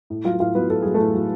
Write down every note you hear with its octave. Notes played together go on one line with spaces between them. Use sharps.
A2
F#3 F4 F5
A2 F4 F5
F#3 B3 B4
A2 A4
F#3 G#4
A3 A4
A2
F#3